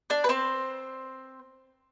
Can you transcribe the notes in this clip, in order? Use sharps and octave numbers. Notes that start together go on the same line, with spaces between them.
D4 D5
B4
C4 C5